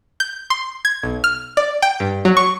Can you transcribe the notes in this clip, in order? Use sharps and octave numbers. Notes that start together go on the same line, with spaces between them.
G6
C6
G#6
B1
F6
D5
G5
G2
F#3
C#6